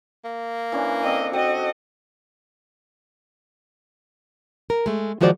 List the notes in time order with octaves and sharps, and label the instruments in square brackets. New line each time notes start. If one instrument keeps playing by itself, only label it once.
[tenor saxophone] A#3
[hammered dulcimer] E3 C#4 D4
[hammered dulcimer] C4 D4 A4 [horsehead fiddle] D#5
[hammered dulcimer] C4 [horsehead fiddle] F#4 D#5
[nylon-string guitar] A#4
G#3 A3
D#3 F3 G#3 F#4 C5 D5